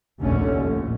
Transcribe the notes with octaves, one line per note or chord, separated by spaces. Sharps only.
F1 A#1 D#2 D3 A3 C#4
A#1 A2